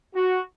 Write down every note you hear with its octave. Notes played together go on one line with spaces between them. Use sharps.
F#4